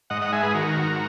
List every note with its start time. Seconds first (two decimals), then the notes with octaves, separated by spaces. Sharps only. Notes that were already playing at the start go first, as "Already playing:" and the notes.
0.10 G#2 D#5 F#5
0.21 D#5 F#5
0.32 G#3 E5 G#5
0.43 G#4 B4
0.54 D#3 F#4 A#4
0.76 G#2